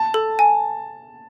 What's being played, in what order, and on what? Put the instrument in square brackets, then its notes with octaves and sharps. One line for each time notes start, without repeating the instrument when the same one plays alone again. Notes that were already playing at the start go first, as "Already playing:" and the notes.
Already playing: [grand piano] A5
[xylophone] A4
G#5